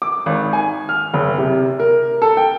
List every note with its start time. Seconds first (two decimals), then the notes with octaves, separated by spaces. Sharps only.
0.02 D6
0.26 G#1
0.53 G#5
0.89 F6
1.14 F#1
1.38 C3
1.80 A#4
2.22 A4
2.37 G5